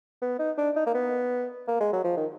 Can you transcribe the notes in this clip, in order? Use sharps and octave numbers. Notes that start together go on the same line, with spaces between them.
B3
D#4
D4
D#4
A#3
B3
A#3
G#3
F#3
F3
D#3